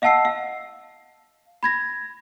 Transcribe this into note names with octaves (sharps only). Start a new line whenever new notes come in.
D#5 F5 F#5 A5 E6 C7
F5
B5 G#6 A#6